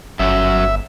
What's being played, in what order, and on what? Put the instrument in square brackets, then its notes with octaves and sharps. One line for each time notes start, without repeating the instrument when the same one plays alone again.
[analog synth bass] G1 [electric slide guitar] F#2 F#3 [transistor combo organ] E5